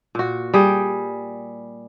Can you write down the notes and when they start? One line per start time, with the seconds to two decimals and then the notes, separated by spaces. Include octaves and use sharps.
0.15 A#2 F#4
0.54 G3 G#4 G5